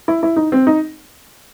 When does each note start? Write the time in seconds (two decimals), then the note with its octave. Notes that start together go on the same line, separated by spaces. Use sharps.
0.08 E4
0.23 E4
0.36 D#4
0.52 C4
0.67 D#4